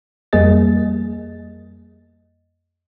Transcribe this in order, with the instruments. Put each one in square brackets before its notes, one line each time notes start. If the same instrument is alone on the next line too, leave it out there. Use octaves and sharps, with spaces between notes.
[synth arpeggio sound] F2 G3 A#3 G#4 D#5 A6